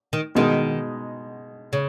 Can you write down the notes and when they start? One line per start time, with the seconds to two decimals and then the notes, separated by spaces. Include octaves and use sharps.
0.13 D#3
0.35 B2 D#3 G#3 D#4
1.73 C#3